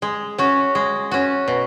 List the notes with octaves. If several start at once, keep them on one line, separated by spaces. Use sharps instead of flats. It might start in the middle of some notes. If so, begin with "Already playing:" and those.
G#3
C#4 F#4
G#3
C#4 F#4
B2